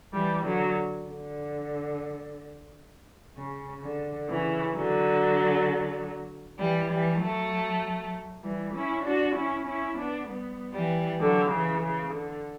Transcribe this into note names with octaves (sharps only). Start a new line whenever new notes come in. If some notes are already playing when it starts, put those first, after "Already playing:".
E3 G3
D3 F#3
D3
C#3
D3
C#3 E3
D3 F#3
E3 G3
E3 G3
F#3 A3
E3 G3
C#4 E4
D4 F#4
C#4 E4
C#4 E4
B3 D4
G3 B3
E3 G3
D3 F#3
C#3 E3
C#3
D3